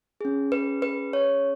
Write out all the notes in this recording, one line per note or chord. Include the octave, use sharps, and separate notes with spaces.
C#4 G#4
B4
B4
C#5